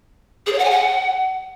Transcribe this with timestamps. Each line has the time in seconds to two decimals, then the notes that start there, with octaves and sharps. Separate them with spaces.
0.46 G#4
0.52 C#5
0.58 F#5
0.64 G#5
0.70 F#5